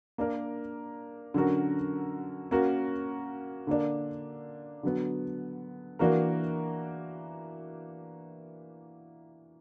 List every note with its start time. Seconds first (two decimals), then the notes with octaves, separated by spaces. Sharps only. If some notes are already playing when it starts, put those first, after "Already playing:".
0.18 A#3 D4 A#4
1.34 D3 F#3 C#4 F#4 A#4
2.51 A#3 C#4 F#4 A#4
3.67 D3 A#3 D4
4.83 D3 F#3 B3
5.99 E3 A#3 D4 F#4 A#4